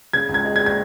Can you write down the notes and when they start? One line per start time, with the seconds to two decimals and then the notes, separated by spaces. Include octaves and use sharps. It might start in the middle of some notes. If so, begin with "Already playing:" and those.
0.13 C#3 G#6
0.29 C#2
0.34 G#6
0.45 G#3
0.56 G#6
0.61 G#3
0.66 G#6